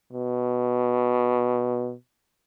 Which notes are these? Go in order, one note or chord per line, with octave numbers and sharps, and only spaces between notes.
B2